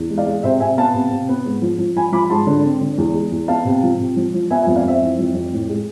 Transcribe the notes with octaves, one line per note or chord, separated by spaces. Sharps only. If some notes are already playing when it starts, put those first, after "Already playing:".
Already playing: E2
G#3
D5 F5
G#3
C3 C5 E5
C3 E5 G#5
B3 F5 A5
C3
C3
B3
G#2
F3
F3
F3 G#5 B5
F3 B5 D6
B5
G#2 A5 C6
D3
C4
D3
E2
G#3
E2
B3 F5 A5
C3
F3
C3
F3
F3
B3 E5 G#5
E5 G#5
F2
D5 F5
F2 C5 E5
E3
F2
F2
A2
G#3